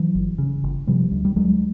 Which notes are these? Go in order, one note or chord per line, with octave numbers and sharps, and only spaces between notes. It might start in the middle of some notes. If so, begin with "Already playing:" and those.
Already playing: E3 F#3
G1
C#3
G1
C3 F3 G3
D2
G3
D2 F#3 G#3